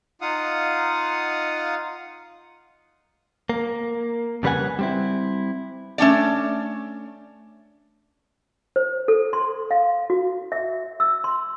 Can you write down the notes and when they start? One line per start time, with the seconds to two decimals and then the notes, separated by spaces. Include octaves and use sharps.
0.21 D#4 F4 F5 F#5 D#6
3.49 A#3
4.43 F2 C#3 G3 B4 F#5 G#5
4.79 G3 C4 E4
5.98 A3 C#4 D4 D5
8.76 C5
9.08 A4
9.33 C6
9.71 F5
10.10 F#4
10.52 E5
11.00 E6
11.24 C6